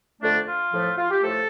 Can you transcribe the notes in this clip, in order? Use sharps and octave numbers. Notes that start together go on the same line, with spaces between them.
F2 D3 A3 D4
F4
A2 F3 A3
F4
G4
A2 F3 A3 A4